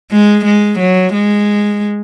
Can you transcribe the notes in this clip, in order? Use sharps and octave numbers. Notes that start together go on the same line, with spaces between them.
G#3
G#3
F#3
G#3